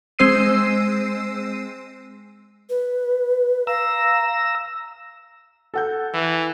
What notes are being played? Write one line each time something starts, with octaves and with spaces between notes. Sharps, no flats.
G#3 C4 C5 E6 C7 D#7
B4
F5 A#5 E6
A4 F#5 G6
E3